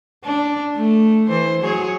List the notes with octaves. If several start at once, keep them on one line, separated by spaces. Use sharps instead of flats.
D4
A3
E3 C5
F#3 G#4 C#5